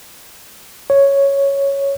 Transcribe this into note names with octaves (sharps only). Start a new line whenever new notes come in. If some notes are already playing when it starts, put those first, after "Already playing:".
C#5